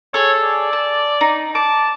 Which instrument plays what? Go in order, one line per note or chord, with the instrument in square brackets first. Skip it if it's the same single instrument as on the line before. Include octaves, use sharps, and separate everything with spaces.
[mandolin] G#4 A4 [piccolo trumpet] C#5
[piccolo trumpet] D5
[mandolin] A5
D#4
[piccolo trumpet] A5 [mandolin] D6